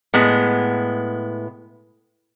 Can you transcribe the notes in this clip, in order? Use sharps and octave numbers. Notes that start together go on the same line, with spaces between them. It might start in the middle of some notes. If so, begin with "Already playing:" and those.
A2 G#3 B3